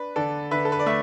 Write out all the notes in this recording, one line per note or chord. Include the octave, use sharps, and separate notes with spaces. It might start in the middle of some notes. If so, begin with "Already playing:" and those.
Already playing: D4 B4
D3 A4 D5
D3 B4 E5
A4
B4
D5
A3 B4 E5